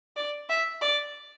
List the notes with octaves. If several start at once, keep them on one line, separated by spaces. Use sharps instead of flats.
D5
E5
D5